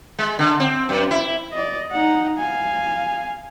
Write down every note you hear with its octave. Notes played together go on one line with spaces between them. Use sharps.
G#3
D3
C4
F#2
E4
D5 D#5
D#4 F#5
F5 G#5